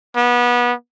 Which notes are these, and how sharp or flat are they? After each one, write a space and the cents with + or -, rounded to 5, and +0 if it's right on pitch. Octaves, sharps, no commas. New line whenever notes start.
B3 -25